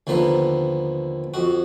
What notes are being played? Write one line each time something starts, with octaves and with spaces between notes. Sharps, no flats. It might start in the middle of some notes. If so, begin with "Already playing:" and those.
D#2 D3 F3 B3 A#5
F2 F#4